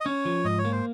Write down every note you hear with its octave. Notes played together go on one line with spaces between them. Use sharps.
D#5
C#4 C#5
F3
G#2 D#5
C#5
A#3
C5